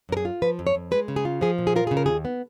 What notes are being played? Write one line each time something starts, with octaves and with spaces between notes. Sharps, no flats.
F#2 A#4
G#4
F4
F3 B4
F2
C#5
F2
G#3 B4
C#3
G#4
F4
F3 G#4
A#2
G#4
F4 A#4
C#3 G#4
A#4
D#2 G#4
B3